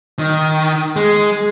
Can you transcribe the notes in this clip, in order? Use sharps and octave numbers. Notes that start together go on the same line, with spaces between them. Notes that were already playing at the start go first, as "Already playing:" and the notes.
D#3
G#3